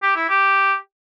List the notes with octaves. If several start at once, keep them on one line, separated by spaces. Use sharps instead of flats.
G4
E4
G4